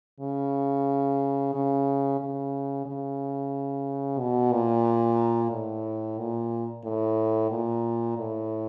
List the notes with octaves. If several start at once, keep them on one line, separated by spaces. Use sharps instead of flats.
C#3
C#3
C#3
C#3
B2
A#2
A2
A#2
A2
A#2
A2